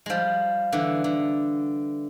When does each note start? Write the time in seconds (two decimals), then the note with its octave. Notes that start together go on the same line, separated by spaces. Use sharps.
0.06 F3 G3 G#3
0.73 D3 E3
1.04 D3